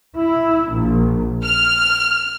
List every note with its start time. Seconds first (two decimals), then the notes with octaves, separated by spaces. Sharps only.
0.16 E4
0.72 A#1
1.44 F6